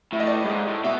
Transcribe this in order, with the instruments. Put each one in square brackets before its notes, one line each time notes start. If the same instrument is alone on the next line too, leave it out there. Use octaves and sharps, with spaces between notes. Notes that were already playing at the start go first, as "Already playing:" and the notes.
[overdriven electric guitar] A2 [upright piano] E5
[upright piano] D#5
D5
D#5
[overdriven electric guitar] G2
G#2
A2
[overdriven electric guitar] B2 [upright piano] E5